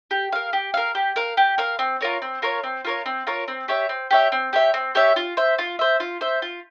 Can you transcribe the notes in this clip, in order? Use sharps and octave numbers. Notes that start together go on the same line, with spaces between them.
G4
A#4 F5
G4
A#4 F5
G4
A#4 F5
G4
A#4 F5
C4
F4 A#4 C#5
C4
F4 A#4 C#5
C4
F4 A#4 C#5
C4
F4 A#4 C#5
C4
G4 C#5 E5
C4
G4 C#5 E5
C4
G4 C#5 E5
C4
G4 C#5 E5
F4
C5 E5
F4
C5 E5
F4
C5 E5
F4